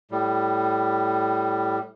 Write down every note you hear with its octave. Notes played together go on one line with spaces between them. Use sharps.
A2 G3